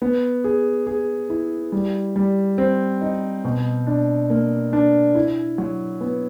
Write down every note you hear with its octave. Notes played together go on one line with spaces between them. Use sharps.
B3
G#4
G#4
E4
G3
G3
C4
D#4
B2
D4
A#3
D4
E4
F#3
B3